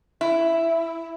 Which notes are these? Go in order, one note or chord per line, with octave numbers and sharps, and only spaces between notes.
E4